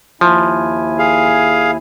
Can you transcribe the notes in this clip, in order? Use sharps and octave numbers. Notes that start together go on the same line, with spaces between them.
D#2 F3 E4 G#5
G#4 F5